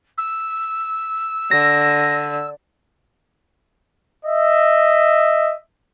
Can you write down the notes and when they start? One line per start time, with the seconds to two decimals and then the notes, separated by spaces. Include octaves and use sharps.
0.18 E6
1.51 D3 A#6
4.25 D#5 E5